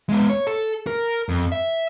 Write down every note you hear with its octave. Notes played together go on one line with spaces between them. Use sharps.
G#3 B3
C#5
A4
A#4
F2
E5